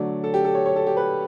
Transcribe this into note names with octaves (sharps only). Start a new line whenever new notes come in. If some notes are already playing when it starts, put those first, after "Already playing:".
Already playing: D3 F#3 A3 D5
A4
G4
A4
C#5
C#5
A4
G4
B4